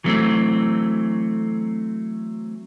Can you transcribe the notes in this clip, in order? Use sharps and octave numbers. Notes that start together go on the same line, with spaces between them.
E3 F#3 A3 C4